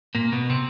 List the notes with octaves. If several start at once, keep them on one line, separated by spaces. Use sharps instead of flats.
A#2 A#3
B2 B3
C3 C4